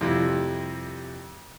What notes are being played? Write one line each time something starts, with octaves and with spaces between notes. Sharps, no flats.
F2 C3 G3 E4